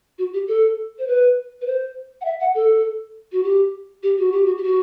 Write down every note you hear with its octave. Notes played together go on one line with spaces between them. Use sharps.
F#4
G4
A4
C5
B4
B4
C5
F#5
E5
F#5
A4
F#4
G4
G4
F#4
G4
F#4
G4
F#4